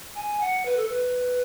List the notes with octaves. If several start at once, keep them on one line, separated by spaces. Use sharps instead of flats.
G#5
F#5
B4
A4
B4